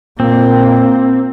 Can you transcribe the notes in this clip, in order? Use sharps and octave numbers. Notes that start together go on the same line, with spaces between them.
A#2 A#3 C4